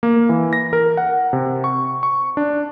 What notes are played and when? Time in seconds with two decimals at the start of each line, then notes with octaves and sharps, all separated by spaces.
0.03 A#3
0.29 E3
0.53 A#6
0.73 A#4
0.97 F#5
1.33 C3
1.64 C#6
2.03 C#6
2.37 D4